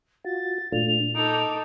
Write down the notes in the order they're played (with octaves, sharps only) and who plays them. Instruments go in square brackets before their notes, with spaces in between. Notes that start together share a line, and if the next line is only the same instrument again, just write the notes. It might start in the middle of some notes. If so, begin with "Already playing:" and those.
[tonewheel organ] F4 F#4 [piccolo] A6
[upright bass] A#2 [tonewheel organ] A3 D4 F4 [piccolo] F7
[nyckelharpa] D#4 A4 [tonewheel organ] D6